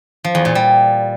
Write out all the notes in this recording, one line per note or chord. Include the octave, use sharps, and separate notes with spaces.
F3
E2
A#2
G3